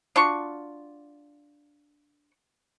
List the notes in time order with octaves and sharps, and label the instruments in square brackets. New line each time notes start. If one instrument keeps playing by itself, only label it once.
[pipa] D4 F4 F#4 C#6